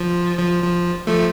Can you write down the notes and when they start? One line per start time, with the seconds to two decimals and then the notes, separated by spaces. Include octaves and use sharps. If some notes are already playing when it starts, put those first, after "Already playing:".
Already playing: F3
0.38 F3
0.64 F3
1.07 F3 A3